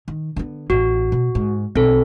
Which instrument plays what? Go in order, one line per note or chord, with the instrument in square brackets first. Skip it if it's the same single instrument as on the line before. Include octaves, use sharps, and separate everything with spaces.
[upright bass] D#3
D3 B3
[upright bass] A1 [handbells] F#4
[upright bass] B2
G#2
[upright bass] B1 [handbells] C4 A4